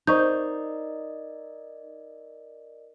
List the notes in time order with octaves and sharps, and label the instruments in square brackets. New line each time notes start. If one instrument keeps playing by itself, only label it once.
[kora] D#4 [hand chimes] A#4 D5 D#5 [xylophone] C5 C#6 G6